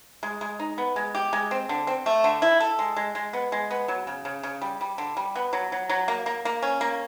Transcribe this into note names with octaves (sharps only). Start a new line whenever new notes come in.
G#3
G#3
D#4
B3
G#3
G4
G#3
C4
D3
C4
A3
D3
E4
A4
G#3
G#3
G#3
B3
G#3
B3
F#3
C#3
C#3
C#3
G3
G3
D3
G3
B3
F#3
F#3
F#3
A#3
A#3
A#3
C#4
A#3